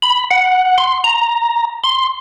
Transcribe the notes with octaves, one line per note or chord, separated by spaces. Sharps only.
B5
F#5
C6
A#5
C6